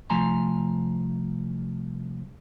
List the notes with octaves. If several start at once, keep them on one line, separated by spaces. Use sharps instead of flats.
C2 F3 A3 G#5 A#5 C6